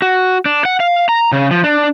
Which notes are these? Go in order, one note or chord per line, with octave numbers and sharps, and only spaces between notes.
F#4
D4
F#5
F5
A#5
C#3
F3
D4